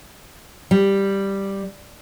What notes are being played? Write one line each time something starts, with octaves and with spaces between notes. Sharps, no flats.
G3